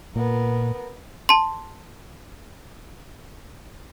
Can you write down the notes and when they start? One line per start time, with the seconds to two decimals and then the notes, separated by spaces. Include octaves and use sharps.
0.16 A#2 B3 A#4
1.29 A5 C6